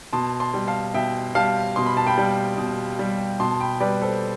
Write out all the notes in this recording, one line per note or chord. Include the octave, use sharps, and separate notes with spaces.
B2 A5 C6
A5 C6
G3
F5 A5
B2 E5 G5
G3 F5 A5
B2 C6
B5
A5
G5 B5
G3
B2
G3
B2 A5 C6
A5
G5 B5
G3 B4 D5
A4 C5